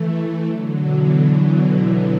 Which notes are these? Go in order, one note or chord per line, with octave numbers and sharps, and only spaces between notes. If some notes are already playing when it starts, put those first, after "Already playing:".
Already playing: E3 A3
E3 A3
D3 F#3
B2 E3